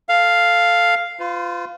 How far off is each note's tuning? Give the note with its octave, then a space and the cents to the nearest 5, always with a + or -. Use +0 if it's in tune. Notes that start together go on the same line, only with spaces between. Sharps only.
A4 +0 F5 +0
F4 +0 B4 +45